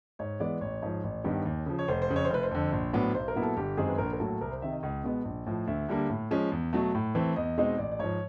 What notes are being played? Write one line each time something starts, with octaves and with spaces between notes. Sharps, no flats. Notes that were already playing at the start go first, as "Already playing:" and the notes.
G#2 C#5
E3 G#3 B3 D5
A1 C#5
G#2 F3
A1
G2 D#3 G3 B3
D#2
C#3 F3
C#5
F1 C5
C5
F2 C#3
C#5
C5
F1 B4
C5
F2 D3
A#1
A2 F#3 B3 D4
B1 C5
A#4
A#2 F#3 B3 E4
A4
G1 G4
F#2 D#3 G#3 C4 G#4
B4
A#1 A#4
A#4
A2 F#3 A#3 A4
C2 A#4
C5
C3 D#3 E5
D#5
C#2
B2 G#3 B3
A#1
A2 F3
D2 E5
D3 G3 A#3 D4
A2
F3 G#3 C#4
E2
B2 F#3 A3
A2
E3 A3 C4
E2 D#5
B2 G#3 C4 D#4
A1 D5
D5
G#2 F3 C#5